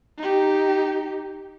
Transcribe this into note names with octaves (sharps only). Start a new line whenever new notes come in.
D#4 G4